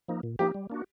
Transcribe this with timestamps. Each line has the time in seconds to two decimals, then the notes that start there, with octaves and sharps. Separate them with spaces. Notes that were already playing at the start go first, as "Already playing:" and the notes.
0.08 F3 A#3 D#4
0.23 A#2
0.39 F3 A#3 D#4 G4
0.54 G3
0.70 A#3 D4 F#4